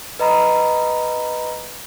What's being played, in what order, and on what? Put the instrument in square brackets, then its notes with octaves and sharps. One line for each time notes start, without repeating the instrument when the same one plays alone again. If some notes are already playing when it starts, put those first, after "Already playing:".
[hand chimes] B4 D#5 A#5 B5